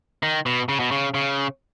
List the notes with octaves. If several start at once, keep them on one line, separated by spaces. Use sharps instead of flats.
D#3
B2
C#3
B2
C#3
C#3